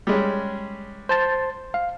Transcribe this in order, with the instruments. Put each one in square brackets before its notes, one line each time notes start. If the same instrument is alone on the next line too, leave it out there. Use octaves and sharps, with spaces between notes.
[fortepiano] G3 G#3 C#4
[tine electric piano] C5 A5 A6
F5